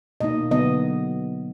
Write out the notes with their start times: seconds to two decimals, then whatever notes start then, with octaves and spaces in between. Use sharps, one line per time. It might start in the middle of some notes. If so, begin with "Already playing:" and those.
0.20 B2 A#3 D#4 D#5
0.51 D3 F#3 B3 D#5